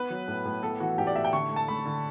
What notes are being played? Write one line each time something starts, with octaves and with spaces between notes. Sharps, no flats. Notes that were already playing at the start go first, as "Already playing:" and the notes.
Already playing: B3 B4
F#3
A2
A2
B3 A4
E3 F#4
A2 G4
D5
A2 E5
G5
D3 C#6
A3
A5
A3 B5
D3